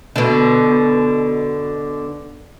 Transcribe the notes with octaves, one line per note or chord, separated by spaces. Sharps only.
B2 D3